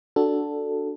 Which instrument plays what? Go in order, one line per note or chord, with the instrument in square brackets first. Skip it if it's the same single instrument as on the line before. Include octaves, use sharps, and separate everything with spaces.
[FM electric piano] D4 F#4 A4